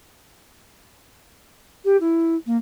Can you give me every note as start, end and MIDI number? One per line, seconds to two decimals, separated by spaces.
1.84 1.96 67
2.00 2.34 64
2.46 2.56 58